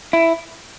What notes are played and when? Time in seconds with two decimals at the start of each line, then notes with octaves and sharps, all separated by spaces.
0.13 E4